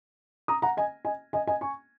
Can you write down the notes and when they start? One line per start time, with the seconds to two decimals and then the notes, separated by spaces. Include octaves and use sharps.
0.48 A#5 D#6
0.62 F#5 A#5
0.77 D#5 G#5
1.05 D#5 G#5
1.33 D#5 G#5
1.47 D#5 G#5
1.61 G#5 C#6